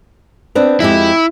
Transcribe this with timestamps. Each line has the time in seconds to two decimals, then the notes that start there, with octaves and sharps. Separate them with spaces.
0.55 B3 C4 D4
0.80 F2 G#3 E4 G4